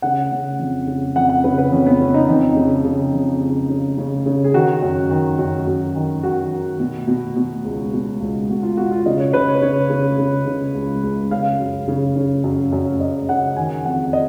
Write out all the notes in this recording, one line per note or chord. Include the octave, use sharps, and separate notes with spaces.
C#3 F#5
C#3
F2
C#3
F2 F#5
F#5
C#3 B4
B4
F2 C#4
B3
C#3 C#4
D#4
F2 D#4
C#3
C#3
F2
C#3
C#3
C#3
C#3
G#4
D#3 F#4
F#2
D#3
F#2
F#2 F#4
D#3
D#3 F#4
D#3
B2
B2
B2
C#2
B2
C#2
B2 F#4
F4
B2 F#4
F4
C#3 D#5
C#5
C#3 B4
C#5
C#3 C#5
C#3
C#3
C#3
C#2
C#2
C#3 F5
F#2
C#3
C#3
F#2
F#2
F#2 D#5
C#3 F#5
D#3 G#5
F2 F#5
D#5